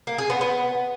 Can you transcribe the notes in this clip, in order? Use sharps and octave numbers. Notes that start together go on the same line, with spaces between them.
A#3
G#4
B3
B3